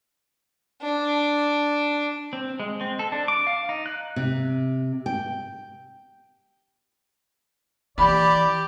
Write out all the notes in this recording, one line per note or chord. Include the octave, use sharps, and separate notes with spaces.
D4
C4
G#3
C4
A4
D4
D6
F5
D#4
F#6
C3
G5
E3 G4 D5 B5